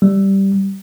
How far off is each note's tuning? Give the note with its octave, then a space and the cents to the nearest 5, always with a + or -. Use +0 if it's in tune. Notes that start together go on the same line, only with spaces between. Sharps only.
G3 -10